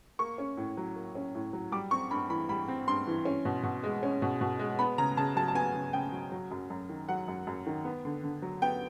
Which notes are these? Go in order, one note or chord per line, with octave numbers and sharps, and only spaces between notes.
A#3 C#6
C#4
A2
F#3
A#3
C#4
A2
F#3
G3 D6
C4 C#6
G2 B5
E3 B5
G3 B5
C4
G2 C6
E3
C#4
B2
B2
G#3
C#4
B2
B2
G#3
B3 B5
C#3 A#5
C#3 A5
F#3 A5
A5
B3 G#5
C#3
C#3 G5
F#3
F#3
F#2
F#2
D#3
F#3 F#5
F#2
F#2
D#3
B3
D3
D3
F#3
B3 G5